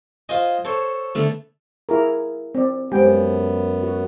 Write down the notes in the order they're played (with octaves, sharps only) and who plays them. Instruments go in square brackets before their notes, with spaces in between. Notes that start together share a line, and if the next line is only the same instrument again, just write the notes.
[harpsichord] F4 C5 D#5 [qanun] G#5
[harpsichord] A4 C5 C#5
[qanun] D3 A3 B3
[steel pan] E4 G#4 A#4
C4 D5
[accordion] F#2 B3 [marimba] G#3 C5 [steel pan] G4 G5
[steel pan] F#4